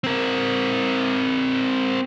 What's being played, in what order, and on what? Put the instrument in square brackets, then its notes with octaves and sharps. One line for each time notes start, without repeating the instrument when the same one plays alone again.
[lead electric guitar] C4 A#4